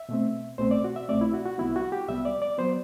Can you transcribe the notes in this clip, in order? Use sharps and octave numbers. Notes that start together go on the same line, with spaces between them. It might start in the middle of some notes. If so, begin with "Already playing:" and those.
Already playing: E5
B2 A3 C4
C2 B2 A3 C4 C5
D5
F#4
E5
C2 B2 A3 C4 D5
E4
F#4
F#4
C2 C3 G3 B3 E4
F#4
G4
C2 C3 G3 B3 E5
D5
D5
F#3 B3 C5